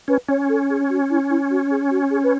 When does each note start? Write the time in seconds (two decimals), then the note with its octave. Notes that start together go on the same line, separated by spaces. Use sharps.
0.08 C#4 B4
0.29 C#4 C#5
0.49 A4
0.70 G#4
0.89 F#4
1.09 E4
1.29 E4
1.50 F#4
1.70 G#4
1.90 F#4
2.10 G#4
2.23 B4